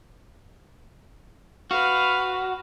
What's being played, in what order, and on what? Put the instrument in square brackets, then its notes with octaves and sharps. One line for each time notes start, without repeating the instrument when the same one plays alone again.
[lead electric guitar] F#4 [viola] B4 F5